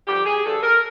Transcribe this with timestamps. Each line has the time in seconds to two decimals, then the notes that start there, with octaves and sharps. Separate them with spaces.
0.07 G2 D3 F3 G4
0.26 G#4
0.44 G2 D3 F3 A4
0.63 A#4